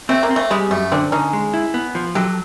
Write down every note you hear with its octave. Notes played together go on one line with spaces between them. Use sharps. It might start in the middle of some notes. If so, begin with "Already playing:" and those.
A3 C4
A#3
C4
A3
G3 G#3
F#2 A3
D3 C4 D4
D3 C#4 D#4
G#3
E4
B3
F3
F#3 G4 A4